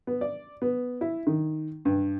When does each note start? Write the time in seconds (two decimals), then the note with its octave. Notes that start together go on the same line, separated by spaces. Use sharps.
0.07 B3
0.21 D5
0.62 B3
1.01 E4
1.27 D#3
1.85 G2